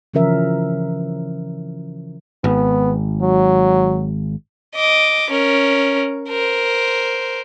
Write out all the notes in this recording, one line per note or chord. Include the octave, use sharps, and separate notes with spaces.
C#3 E3 F3 C#4 A#4 E5
G#1 B3
F#3
D#5 D6
C#4 A#4
A#4 C5